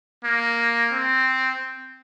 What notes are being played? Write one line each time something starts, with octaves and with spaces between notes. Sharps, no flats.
A#3
C4